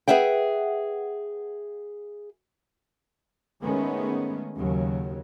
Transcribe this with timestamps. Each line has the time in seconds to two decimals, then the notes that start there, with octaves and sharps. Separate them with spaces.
0.08 G#4 B4 E5 F#5 G5
3.61 D#3 G#3 A3 B3 C#4
4.58 D#2 C#3 F#3